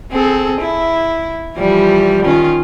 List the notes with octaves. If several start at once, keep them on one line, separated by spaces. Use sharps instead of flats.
C4 G#4 A4
E4
E3 F3 G3
D#3 C#4 F4